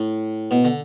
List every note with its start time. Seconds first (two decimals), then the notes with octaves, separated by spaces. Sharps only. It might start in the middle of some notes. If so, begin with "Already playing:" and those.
Already playing: A2
0.51 B2
0.64 D3